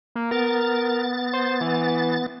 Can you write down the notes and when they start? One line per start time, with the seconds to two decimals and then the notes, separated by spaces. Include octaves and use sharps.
0.16 A#3
0.31 B3 A#4 A6
1.33 C5
1.61 E3